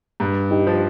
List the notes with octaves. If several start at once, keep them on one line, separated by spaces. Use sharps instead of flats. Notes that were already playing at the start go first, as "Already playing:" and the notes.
G2
D#4 G4
F3